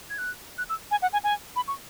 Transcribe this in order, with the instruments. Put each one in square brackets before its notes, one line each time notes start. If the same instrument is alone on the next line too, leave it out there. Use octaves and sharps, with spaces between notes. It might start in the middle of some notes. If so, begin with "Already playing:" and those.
[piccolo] G#6
F#6
F#6
E6
G#5
F#5
G#5
G#5
B5
C#6